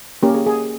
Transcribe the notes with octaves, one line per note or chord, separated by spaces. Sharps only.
A#3 C#4 G4 A#4
G#4
G#4